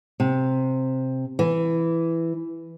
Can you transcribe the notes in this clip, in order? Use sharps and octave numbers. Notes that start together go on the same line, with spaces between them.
C3
E3